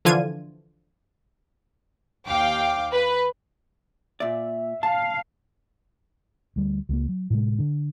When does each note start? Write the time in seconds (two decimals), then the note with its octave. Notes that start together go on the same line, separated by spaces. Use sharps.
0.05 D3 E3 F3 F4 G#6 D#7
2.27 D#2 F5 G5 D6
2.93 B4
4.20 A#2 D5 E5
4.83 F5 A5
6.56 D2 G3
6.89 C#2 F#3 A#3
7.09 F#3
7.30 A2 C3 G#3
7.58 D3 D4